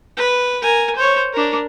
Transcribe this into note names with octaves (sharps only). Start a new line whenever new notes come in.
B4
A#4 G#5
C5 C#5
D4 A#4